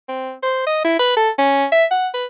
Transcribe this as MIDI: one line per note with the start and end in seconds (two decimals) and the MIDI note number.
0.09 0.32 60
0.43 0.66 72
0.66 0.84 75
0.84 0.96 64
0.99 1.14 71
1.17 1.30 69
1.38 1.65 61
1.72 1.85 76
1.91 2.08 78
2.14 2.25 71